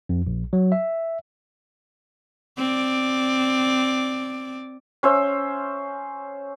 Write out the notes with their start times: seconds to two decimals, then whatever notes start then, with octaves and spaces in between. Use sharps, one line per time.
0.09 F2
0.27 A#1
0.53 F#3
0.72 E5
2.58 C4 D5
5.03 C#4 C5 E5